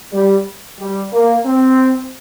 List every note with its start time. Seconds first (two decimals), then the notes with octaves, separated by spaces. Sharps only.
0.13 G3
0.80 G3
1.12 A#3
1.45 C4